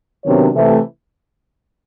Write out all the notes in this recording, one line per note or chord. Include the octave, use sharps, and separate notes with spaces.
C3 D#3 F#3 B3 D4 C#5
C3 E3 A3